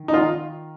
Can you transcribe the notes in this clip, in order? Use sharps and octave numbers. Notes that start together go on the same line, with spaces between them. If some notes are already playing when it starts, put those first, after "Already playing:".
Already playing: D#3
D#4
F4